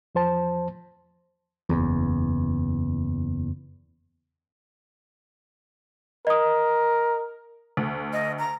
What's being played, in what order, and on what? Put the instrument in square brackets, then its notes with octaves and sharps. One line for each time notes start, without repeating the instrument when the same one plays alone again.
[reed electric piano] E2 F3 C5 A5
[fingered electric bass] F#1 E2
[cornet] A#4 [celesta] D#5 D#6
[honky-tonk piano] D2
[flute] D#5
A#5